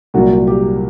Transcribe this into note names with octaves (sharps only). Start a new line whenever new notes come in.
C2 A#2 F#3 A#3 F#4
G4